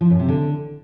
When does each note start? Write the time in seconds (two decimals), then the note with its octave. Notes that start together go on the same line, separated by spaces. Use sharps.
0.01 F3
0.10 F#2
0.19 C3
0.28 D3